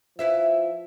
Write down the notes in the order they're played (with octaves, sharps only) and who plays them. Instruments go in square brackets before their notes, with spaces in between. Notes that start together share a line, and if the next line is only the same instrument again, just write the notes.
[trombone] F3 [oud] E4 B4 E5